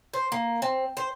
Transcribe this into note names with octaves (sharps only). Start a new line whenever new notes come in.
C5
A#3
C4
C5